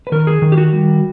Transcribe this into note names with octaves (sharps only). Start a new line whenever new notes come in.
B4
D#3 A#4
G#4
D#3
G4
F#4
G3